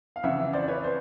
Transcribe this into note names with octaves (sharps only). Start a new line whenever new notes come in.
F5
F2 C#3 E3 E5 F#5
C5 D5
B4 C#5
C5